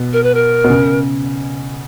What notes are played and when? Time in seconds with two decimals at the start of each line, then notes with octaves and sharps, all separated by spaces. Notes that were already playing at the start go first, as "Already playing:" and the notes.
Already playing: B2
0.13 A#4
0.23 B4
0.35 A#4
0.64 B2
0.70 C#3